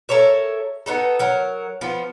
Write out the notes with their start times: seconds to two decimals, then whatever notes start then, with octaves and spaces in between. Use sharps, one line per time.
0.09 A4 A#4 C#5 E5
0.86 B3 D#4 A4
1.19 F#3 A#4
1.81 F3 B3